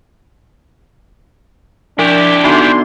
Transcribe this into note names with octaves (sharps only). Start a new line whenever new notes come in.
F3 D4 E4 G4
D3 B3 D#4 F#4 C6